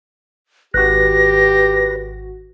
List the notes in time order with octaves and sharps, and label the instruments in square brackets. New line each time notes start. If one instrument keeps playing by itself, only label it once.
[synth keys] G#1 F#4 [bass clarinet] G4 [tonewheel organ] B4 [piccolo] A#6